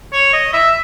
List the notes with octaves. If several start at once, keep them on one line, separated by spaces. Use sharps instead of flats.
C#5
D#5
E5